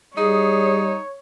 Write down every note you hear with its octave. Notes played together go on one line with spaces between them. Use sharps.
G3 D#4 G#4 C#5